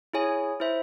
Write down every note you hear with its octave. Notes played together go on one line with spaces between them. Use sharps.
E4 G#4 C#5 G#5
E4 C5 E5